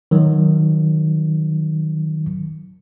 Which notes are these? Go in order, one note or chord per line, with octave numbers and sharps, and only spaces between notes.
D#3 F#3